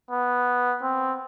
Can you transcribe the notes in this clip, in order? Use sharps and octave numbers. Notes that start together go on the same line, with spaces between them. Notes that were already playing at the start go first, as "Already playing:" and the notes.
B3
C4